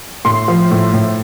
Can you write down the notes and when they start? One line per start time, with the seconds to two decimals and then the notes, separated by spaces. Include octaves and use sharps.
0.25 A2 C6
0.48 F3
0.71 A2
0.93 A2